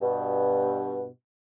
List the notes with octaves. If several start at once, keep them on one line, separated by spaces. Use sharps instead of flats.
G2 B2